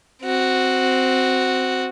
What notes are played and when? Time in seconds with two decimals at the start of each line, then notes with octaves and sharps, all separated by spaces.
0.23 C4 F#4